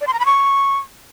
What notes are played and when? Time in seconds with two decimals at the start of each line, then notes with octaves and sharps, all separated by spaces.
0.01 D5
0.07 C6
0.13 A#5
0.19 B5
0.26 C#6